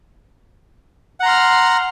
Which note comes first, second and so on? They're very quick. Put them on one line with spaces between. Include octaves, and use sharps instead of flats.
F#5 A#5 C6 F6